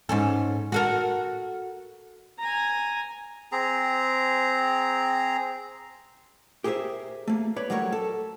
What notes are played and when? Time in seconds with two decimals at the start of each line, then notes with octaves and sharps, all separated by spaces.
0.09 G#2 C#4 A4
0.72 F#4 A4 A#4
2.39 G#5 A#5
3.52 C4 G#4 A#5
6.64 G4 G#4 A#4 C5 E5
7.27 A3 A#3
7.56 B4 C#5 D5 B5
7.70 F#3 G3 A3 A#4 C5 C#5
7.92 A4